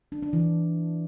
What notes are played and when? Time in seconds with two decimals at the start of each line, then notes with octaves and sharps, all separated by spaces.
0.12 D4
0.23 D4
0.33 E3